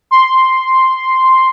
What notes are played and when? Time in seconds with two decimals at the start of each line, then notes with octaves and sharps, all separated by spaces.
0.11 C6